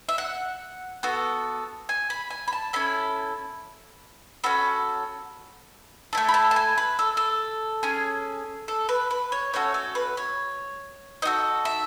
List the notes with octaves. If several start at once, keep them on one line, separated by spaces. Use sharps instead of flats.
E5
F#5
B3 F#4 A4
G#5
B5
G#5
B5
A5
C#4 E4 A4 B5
C#4 F#4 A4 B5
A3 E4 A4
B5
A5
A5
G#5
B4
A4
A4
C#4 G#4
A4
B4
B4
C#5
A3 C#4 F#4 A4 C#5
A4
B4
C#5
D#4 F#4 A4 D#5
E5